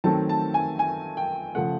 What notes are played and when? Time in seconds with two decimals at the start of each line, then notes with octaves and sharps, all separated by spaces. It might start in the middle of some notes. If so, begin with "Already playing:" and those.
0.04 D#3 F#3 A3 C4 A5
0.29 A5
0.54 G#5
0.79 G#5
1.17 G5
1.55 C#3 F3 A3 F#5